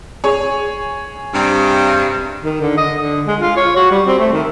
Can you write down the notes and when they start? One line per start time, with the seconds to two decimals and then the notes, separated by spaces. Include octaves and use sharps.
0.24 G#4 C#5
1.34 G2 C3
2.44 D#3
2.61 D3
2.77 D#5
3.00 D3
3.27 G#3
3.40 F4
3.57 C#5
3.76 F#4
3.91 G3
4.07 C4
4.19 A3
4.33 D#3